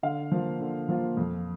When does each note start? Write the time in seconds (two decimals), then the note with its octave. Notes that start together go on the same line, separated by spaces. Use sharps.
0.03 D3 F5
0.32 F3 A#3 F4
0.60 D3
0.89 F3 A#3 F4
1.17 F2